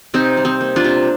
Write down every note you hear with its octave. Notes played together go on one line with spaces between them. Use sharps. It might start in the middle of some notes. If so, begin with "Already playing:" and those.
C3 C4 D#4
G3
C4 D#4
A#3
D4 F4
C3